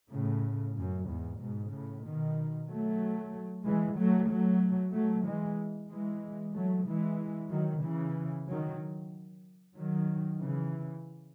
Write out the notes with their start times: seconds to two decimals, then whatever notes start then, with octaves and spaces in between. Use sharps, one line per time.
0.12 A2 C#3
0.76 F#2
1.08 E2 G#2
1.40 G#2 B2
1.72 A2 C#3
2.05 B2 D#3
2.69 F#3 A3
3.65 E3 G#3
3.98 F#3 A3
4.30 F#3 A3
4.94 F#3 A3
5.26 E3 G#3
5.90 E3 G#3
6.55 F#3 A3
6.87 E3 G#3
7.51 D#3 F#3
7.83 C#3 E3
8.48 D#3 F#3
9.76 D#3 F#3
10.41 C#3 E3